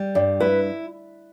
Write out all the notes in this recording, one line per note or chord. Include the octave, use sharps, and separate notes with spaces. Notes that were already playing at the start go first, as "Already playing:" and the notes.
Already playing: G3
G2 D5
E4 B4